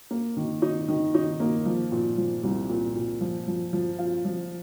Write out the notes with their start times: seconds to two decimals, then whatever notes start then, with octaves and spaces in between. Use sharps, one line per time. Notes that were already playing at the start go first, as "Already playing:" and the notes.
0.11 A#3
0.37 D#3
0.62 D#4
0.88 D#3
1.14 D#4
1.40 A#3
1.66 F3
1.92 A#2
2.18 F3
2.43 C2
2.69 A#2
2.95 A#2
3.21 F3
3.47 F3
3.73 F3
3.99 F4
4.25 F3